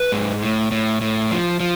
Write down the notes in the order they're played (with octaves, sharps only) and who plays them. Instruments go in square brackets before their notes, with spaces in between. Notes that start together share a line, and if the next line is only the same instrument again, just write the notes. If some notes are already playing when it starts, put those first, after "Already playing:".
Already playing: [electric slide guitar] B4
G#2
A2
A2
A2
F3
F3